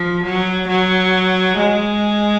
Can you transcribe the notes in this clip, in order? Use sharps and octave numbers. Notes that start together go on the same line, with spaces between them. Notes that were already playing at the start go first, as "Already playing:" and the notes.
Already playing: F3
F#3
F#3
G#3